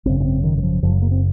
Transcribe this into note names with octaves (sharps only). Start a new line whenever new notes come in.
G#1 F#2 C#3 C4
C#4
C4
D#3
D#3
F3
F#1 F#2 C#3 F3
F#3
A#3
C4